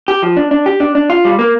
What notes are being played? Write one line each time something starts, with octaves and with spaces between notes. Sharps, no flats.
G4
F3
D4
D4
G4
D4
D4
F4
G3
A#3